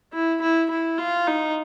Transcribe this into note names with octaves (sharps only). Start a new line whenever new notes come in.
E4
E4
E4
F4
D#4